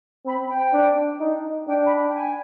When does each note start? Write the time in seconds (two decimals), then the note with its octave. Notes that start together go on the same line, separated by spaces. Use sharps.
0.25 C4 B5
0.49 G5
0.73 D4
1.20 D#4
1.67 D4 G5
1.84 B5
2.07 G5
2.15 G#5